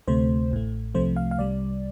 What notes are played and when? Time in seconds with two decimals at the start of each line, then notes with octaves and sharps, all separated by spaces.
0.08 D2 C3 A3 C5
0.51 A1 A2 A3
0.95 C2 C3 F3 A3 C5
1.16 F5
1.31 F5
1.38 C2 C3 G3 D5